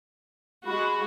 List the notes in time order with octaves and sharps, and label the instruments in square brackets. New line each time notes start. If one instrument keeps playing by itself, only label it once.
[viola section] G#3 F#4 [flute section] B5